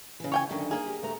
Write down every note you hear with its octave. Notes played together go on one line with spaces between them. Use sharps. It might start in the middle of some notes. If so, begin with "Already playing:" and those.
C#3 E3
C#5 G5 G#5
F#2 D3 D#3 A3
A#3 G#4
G4
D2 A3 A#5